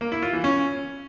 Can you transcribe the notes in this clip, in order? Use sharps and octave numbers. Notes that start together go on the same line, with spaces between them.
A#3
E4
F4
E3
C#4